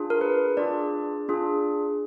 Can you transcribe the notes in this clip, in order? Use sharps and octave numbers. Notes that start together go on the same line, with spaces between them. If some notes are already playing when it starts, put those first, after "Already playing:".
Already playing: D4 F4 G#4
A#4
B4
D4 F4 G#4 D5
D4 F4 G#4